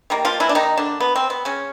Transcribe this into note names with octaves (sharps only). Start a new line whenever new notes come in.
D#3 G3 A#3
F3 F4
E3 E4
D4
D#3 D#4
D3 D4
B3
C4
B3
C#3 C#4